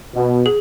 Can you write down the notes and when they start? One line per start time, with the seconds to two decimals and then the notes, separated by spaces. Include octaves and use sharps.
0.14 B2
0.46 G#4